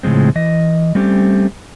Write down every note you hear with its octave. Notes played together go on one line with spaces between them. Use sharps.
A2 C#3 F3 G#3 C4
E3 D#5
G3 A3 C4 C#4 G4